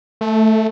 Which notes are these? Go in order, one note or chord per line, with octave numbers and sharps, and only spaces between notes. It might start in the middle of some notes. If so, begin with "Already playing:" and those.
A3